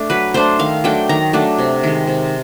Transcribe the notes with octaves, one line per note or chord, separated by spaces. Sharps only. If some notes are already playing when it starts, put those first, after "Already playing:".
Already playing: A3 D4
F#3 B4
A3 D4 C5
D#3 F5
F#3 A3 D4 G5
D#3 A#5
F#3 A3 D4
C3
D#3 G#3
C3